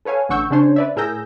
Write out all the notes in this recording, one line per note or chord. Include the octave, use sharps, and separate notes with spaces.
A4 B4 C#5 F5 G#5
A1 D3 F#5 C#6 E6 G6
C#3 C#4 D4 C5 C#5
B4 D5 E5
A2 G#4 A#4 E6 G6 A#6